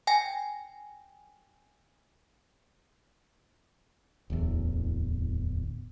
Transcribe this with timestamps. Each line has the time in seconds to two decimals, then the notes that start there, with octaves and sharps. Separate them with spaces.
0.07 G5 G#5 A#6
4.30 D1 A1 E2